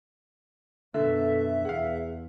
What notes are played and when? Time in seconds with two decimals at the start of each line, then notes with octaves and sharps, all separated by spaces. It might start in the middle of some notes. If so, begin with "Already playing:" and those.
0.94 F#2 B2 D3 A4 E5
1.65 E2 G#4 F5 F#5